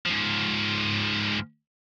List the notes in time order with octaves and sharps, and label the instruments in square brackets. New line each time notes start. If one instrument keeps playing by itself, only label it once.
[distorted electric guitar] G#2 F3